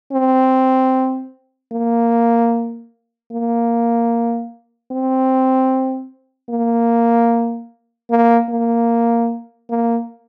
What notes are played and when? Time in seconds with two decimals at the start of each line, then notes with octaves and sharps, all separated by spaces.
0.12 C4
1.73 A#3
3.32 A#3
4.92 C4
6.50 A#3
8.10 A#3
8.49 A#3
9.70 A#3